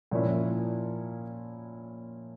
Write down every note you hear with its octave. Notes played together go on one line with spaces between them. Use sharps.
A#2 F3 A#3 C#4 E4